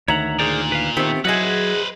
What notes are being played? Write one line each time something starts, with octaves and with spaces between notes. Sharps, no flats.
D2 D#3 C#5 E5 F#5 A#5
A#2 G#4 C5 D5
B4 F5
D#3 A3 B3 C4 G4
F#3 E4 G#4 B4 C5 D#5 F#5